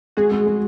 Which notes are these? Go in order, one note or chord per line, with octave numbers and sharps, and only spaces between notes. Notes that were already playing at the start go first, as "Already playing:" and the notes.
G#3 F#4 G#4
G#3
G#3